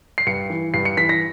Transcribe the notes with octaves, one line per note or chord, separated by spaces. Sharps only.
C7
G2 C#7
E3
G2 C7
C#7
E3 B6
A#6